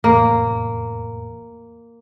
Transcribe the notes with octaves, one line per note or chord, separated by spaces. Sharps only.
F1 E2 A2 A#3